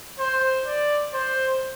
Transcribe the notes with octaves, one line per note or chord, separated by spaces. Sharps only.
C5
D5
C5